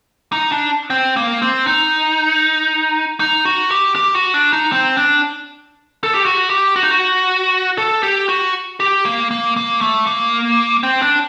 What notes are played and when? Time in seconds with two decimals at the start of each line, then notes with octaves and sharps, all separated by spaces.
0.32 D#4
0.52 D4
0.90 C4
1.16 A#3
1.42 C4
1.67 D#4
3.20 D#4
3.45 F#4
3.71 G4
3.96 G4
4.15 F#4
4.34 D4
4.53 D#4
4.72 C4
4.97 D4
6.03 A4
6.14 G4
6.25 F#4
6.50 G4
6.76 F#4
6.83 D#4
6.91 F#4
7.78 A4
8.03 G4
8.29 F#4
8.80 G4
9.05 A#3
9.31 A#3
9.57 A#3
9.81 A3
10.07 A#3
10.83 C4
11.02 D4